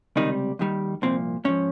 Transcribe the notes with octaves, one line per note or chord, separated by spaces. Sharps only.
C#2 C3 D#3 G3 D#4
D#2 D#3 G3
C2 A#2 F3 C4
G#2 F3 C#4